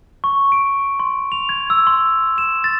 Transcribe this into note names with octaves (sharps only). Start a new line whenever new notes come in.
C#6
D7
C6
F7
G#6
E6
C6
E7
A6